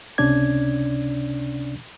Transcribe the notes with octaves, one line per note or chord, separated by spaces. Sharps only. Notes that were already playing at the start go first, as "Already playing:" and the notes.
C#2 C3 C#4 D4 D5 G#6